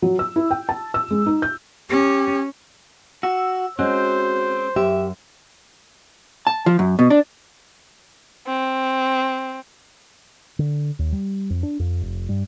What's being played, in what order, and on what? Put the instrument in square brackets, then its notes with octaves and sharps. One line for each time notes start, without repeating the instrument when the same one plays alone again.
[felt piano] F#3
E6
E4
G5
A5
E6
G#3
D#4
G6
[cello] C#4 [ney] G4
[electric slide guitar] F#4 [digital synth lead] E6
[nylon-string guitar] G#3 C#4 [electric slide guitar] C4 [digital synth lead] F#4 [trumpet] C5
[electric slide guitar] F#2 [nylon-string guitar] G4 [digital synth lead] E5
[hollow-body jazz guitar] A5
F3
F#2
B2
D4
[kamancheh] C4
[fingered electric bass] D3
D#2
G3
F2
D4
F2
F1
G2